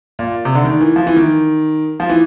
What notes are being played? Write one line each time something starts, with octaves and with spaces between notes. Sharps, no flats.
A#2
C3
D3
D#3
E3
F3
E3
D#3
F3
E3